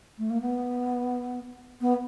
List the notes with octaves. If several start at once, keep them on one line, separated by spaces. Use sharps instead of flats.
A3
A#3
B3
B3